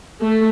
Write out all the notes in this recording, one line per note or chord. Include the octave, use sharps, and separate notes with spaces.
A3